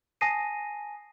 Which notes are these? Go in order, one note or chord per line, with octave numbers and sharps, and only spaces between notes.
G#5 A5 D#6 A#6 C7 D#7